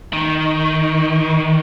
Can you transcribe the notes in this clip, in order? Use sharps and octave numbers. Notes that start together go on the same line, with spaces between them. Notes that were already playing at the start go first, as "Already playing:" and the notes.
D#3